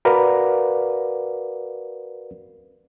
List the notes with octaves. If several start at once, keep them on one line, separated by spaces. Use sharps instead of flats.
F#4 A#4 B4 D5 F5 F#5